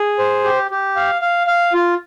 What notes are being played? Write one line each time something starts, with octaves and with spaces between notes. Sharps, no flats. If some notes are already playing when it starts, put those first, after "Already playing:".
Already playing: G#4
C5
G4
G4
F5
F5
F5
F4